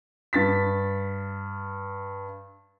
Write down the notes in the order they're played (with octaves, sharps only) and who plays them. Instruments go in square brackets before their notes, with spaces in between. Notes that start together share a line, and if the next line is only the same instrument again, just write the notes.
[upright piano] G2 A6 B6